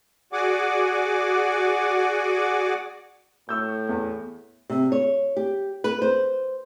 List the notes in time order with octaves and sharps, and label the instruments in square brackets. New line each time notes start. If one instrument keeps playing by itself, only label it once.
[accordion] F#4 G#4 D5 F#5 G#5 D6
[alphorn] A2 [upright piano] C#6 E6 G6
[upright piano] E2
[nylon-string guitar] C3
C#5
G4
B4
C5